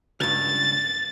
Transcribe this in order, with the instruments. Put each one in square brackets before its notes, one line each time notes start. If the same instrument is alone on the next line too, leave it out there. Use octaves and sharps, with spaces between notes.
[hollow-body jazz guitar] C#2 G2 [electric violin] A6